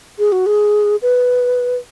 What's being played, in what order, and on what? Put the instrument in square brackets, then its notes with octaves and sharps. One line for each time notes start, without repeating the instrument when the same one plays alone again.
[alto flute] G#4
F#4
G#4
B4